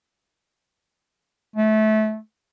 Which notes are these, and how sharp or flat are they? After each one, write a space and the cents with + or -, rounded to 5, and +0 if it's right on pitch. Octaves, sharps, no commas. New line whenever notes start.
A3 -25